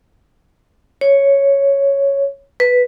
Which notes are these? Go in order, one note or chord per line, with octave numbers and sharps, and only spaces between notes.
C#5
B4